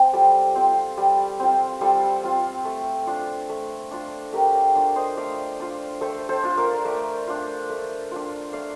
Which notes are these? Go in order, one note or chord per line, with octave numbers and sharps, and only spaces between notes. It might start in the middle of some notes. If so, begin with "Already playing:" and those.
Already playing: C4 G5
G3 F4 A4
C4 F4
G3
C4 F4
G3 F4 A4
C4 F4
A3
D4 F4
A3
D4 F4
A3 G4 A#4
D5 F5
D4 F4
C5 D#5
A3 D5 F5
D4 F4
A3 A4 C5
A4 C5
D4 F4
A#4 D5
A3 A#4 D5
D4 F4
A3
D4 F4
A3 D5 F5